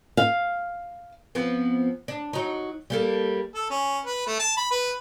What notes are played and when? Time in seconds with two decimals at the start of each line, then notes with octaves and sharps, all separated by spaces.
0.17 F5
1.35 F3 B3 C4
2.08 D4
2.33 F#3 D#4
2.90 G3 A#3 A4
3.54 A4
3.70 C#4
4.05 B4
4.26 A3
4.40 A5
4.57 B5
4.71 B4